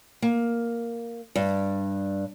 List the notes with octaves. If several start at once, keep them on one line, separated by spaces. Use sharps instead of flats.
A#3
G2